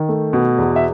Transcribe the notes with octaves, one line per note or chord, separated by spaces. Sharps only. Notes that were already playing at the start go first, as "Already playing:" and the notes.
Already playing: D#3
A3
B2
E2
E5